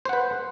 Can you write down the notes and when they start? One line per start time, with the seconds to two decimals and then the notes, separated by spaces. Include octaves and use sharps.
0.05 C5
0.09 F#5
0.13 B4